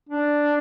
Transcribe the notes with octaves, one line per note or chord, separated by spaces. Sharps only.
D4